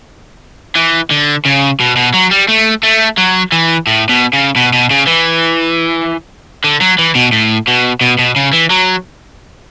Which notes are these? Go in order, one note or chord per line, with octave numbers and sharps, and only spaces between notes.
E3
D3
C#3
B2
B2
F#3
G3
A3
A3
F#3
E3
A2
B2
C#3
B2
B2
C#3
E3
D3
F#3
E3
B2
A2
B2
B2
B2
C#3
E3
F#3